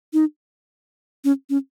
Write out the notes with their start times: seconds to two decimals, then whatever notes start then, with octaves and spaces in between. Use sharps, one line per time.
0.13 D#4
1.24 C#4
1.50 C#4